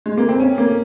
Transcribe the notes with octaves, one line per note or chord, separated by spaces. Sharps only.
G#3
A#3
C4
C#4
A#3